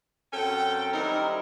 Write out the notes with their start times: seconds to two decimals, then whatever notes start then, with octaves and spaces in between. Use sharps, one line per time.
0.32 F#2 C4 C#4 A4 F#5 G5
0.93 D#3 G3 C4 D#4 E4 A#4